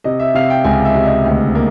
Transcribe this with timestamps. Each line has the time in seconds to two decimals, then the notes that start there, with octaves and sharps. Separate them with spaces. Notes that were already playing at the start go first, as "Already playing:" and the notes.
0.04 C3 D#5
0.20 E5
0.34 C3 F5
0.50 G5
0.64 C#2 G#5
0.85 E5
0.95 C3
1.06 D#5
1.25 D2
1.55 A#3